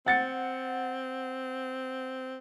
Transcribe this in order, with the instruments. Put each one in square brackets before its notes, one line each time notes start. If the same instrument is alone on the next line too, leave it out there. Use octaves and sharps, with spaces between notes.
[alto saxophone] C4 [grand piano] F#5 A6 C#7